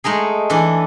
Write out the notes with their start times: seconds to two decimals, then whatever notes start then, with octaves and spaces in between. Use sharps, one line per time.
0.04 G#3 A3 D#4 G#4
0.50 E3 D4 A4